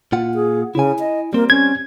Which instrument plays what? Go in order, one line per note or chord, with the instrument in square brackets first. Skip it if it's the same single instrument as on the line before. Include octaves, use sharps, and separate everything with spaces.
[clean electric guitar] A#2 F4 F#5
[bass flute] G#4
[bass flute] C#3 [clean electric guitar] E4 G#5
[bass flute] D#5
[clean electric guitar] G3 C4 [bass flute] A#3
[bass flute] C#4 [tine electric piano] G#6